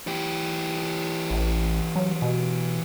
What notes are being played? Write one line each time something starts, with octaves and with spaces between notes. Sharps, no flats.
E3 G4
A1
F#3
B2